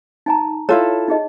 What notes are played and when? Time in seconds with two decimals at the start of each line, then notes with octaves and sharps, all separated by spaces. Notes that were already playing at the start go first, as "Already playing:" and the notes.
0.26 D#4 G#5 A#5
0.69 E4 F4 A4 C#5
1.08 D#4 G#4 D#5